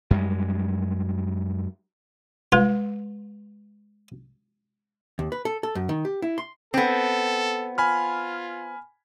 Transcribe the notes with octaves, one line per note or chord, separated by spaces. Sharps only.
F#2 G3 G#3
G#3 F4 B4
D#2
B4
A4
A4
F#2
D#3
G4
E4
C6
B3 C4 A4
F4 G#5 B5 F6